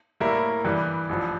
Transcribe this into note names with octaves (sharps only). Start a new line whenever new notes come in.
A2 G3 A#3 E4 A#4
G2 E3 G3
A1 G2 F3